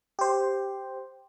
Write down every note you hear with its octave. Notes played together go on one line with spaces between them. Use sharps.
G4 C5